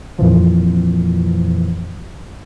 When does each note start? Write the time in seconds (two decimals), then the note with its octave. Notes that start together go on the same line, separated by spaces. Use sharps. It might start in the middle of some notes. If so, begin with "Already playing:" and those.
0.18 F2 A#2 E3 F3